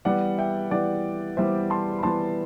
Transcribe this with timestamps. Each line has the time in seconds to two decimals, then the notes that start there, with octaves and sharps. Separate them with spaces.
0.05 E3 G3 B3 D5 F#5
0.38 E5 G5
0.71 E3 G3 B3 D5 F#5
1.37 E3 G3 B3 C5 E5
1.70 A5 C6
1.99 B5
2.03 E3 G3 B3 A5 C6